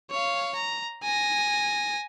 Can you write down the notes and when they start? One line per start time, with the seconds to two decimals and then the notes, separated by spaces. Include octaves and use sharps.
0.11 C#5 F5
0.56 A#5
1.03 G#5 A#6